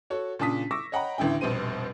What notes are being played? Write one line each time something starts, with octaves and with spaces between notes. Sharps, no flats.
F#4 A4 C#5
A#2 C#3 D4 A5 D#6 B6
C#6 D6 E6 A#6
C#5 D#5 F#5 G5 A#5 B5
A1 D2 D3 E4 G5
F1 A#1 B2 G3 C5 D#7